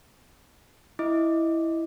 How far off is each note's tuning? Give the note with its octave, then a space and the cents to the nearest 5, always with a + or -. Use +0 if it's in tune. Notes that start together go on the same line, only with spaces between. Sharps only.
E4 +0 D#5 +5 D6 +0